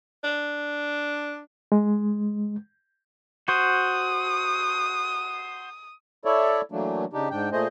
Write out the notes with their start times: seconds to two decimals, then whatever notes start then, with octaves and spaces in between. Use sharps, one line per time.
0.24 D4
1.72 G#3
3.48 F#4 C5 D#6
6.25 E4 A4 C#5 D5 E5
6.72 E3 F#3 A3 A#3 D4
7.13 C#3 D4 D#4 G4
7.30 G#2 D4 G5
7.52 A#2 A3 G#4 C5 D#5